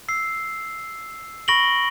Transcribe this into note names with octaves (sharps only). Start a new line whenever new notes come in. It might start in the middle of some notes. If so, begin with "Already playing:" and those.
E6 C7
B5 C#6 A#6 D7 F#7 G7